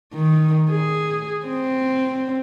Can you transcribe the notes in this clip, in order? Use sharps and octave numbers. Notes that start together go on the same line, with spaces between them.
D#3
G#4
C4